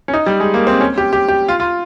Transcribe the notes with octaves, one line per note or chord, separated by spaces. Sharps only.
C#4
D#4
G3
G#3
A#3
C4
C#4
G4
G4
G4
F4
F4